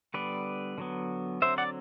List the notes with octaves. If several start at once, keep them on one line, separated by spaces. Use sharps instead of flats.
D3 G3 B3 B4 D5
D3 F#3 B3
D3 F#3 C4 C5 E5
D5 F#5